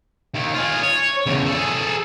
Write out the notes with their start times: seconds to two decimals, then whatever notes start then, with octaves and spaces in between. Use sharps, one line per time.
0.34 D#2 D#3
0.54 F4 G#4
0.83 C#5
1.26 E2 C#3
1.46 G#4 A4